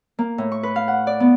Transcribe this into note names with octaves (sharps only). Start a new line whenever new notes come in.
A#3
A2
C#6
B4
F5
F#5
D5
B3